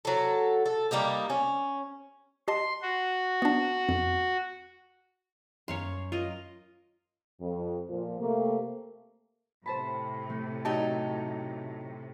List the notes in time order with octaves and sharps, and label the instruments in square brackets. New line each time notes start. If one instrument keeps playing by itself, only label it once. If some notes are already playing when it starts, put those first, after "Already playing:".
[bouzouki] F#3 A4
A4
G3 A#3 D#4 G4
C#4
[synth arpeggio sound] G4 D#5 A5 [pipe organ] C6
[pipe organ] F#4
[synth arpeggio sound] B3 D4
F2
[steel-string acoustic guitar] F#2 [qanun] C#5 F5 C6
[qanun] F4 A#4 D#5
[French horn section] F2
A#2 F3
C3 A3 A#3
[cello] A2 C3 [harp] C5 A5 B5
[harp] A3
[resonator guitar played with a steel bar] F#3 D#4 [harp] G4 [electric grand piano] A5